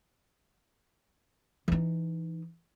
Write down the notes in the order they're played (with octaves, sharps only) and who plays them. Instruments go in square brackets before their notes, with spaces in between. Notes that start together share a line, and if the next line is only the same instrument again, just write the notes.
[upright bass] E3 D#4